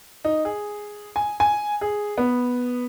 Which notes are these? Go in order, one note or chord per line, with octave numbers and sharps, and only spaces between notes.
D#4
G#4
G#5
G#5
G#4
B3